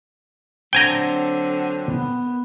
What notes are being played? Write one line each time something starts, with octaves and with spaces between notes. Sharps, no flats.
D3 F#3 C4 G5 G#5 A#5
B3